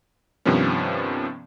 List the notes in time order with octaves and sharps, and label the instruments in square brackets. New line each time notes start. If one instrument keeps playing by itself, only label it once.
[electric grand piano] G2 C3 D#3 F3 B3 C#4